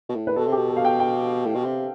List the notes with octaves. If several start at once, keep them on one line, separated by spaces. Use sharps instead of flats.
B2
A2
B4
B2 A4
C3
B2 G4
A4
F5
G5
G5
A2
B2
C3